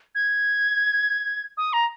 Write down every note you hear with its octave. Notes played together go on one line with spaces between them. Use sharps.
G#6
D#6
A#5